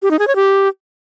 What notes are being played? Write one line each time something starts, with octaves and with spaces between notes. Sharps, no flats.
G4
D#4
G#4
C#5
G4